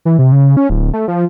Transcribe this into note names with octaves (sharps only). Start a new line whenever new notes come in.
E3
C3
C#3
C#4
D1
A3
F3